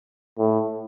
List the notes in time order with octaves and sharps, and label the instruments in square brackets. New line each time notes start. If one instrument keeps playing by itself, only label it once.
[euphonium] A2